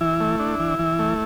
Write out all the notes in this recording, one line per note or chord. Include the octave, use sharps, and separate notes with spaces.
E3 E4
A3
D4
E3
E3
A3